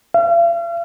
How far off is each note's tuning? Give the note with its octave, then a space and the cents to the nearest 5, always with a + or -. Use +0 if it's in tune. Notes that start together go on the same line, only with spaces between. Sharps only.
F5 -45